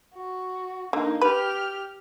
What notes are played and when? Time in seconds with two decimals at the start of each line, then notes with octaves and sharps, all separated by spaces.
0.15 F#4
0.93 D3 A#3 D#4
1.22 G4 B4 F6